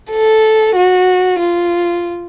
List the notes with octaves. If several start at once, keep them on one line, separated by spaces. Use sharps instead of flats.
A4
F#4
F4